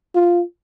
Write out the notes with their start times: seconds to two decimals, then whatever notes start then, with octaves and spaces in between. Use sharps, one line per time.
0.15 F4